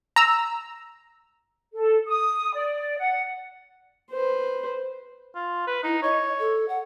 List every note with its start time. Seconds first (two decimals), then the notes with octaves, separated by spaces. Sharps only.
0.16 A#5 E6
1.73 A4
2.08 D#6
2.54 D5
2.98 F#5
4.11 B4 C5
5.36 F4
5.68 B4
5.84 D#4 E4
6.03 C#5 D#5
6.39 A4
6.68 F#5